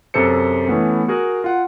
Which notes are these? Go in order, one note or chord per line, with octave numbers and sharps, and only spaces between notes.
F#2 C3 A4 C5 C#7
E3 A3 B3 C#4
F#4 G#4 A#4
F4 F#5